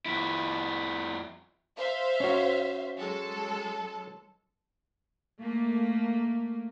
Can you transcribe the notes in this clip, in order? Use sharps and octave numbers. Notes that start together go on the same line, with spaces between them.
F2 E4
C5 E5 F5
C#4 F#4
F#3 G#3 A4
A3 A#3